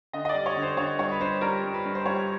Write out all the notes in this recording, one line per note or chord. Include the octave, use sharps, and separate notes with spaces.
D3 D#5
D#5
D5
G3
C#5
D3
C5
D3 C#5
G2 C#5
B4
G2 C5
G3 A#4
G3
B4
G2
C5
G3 C#5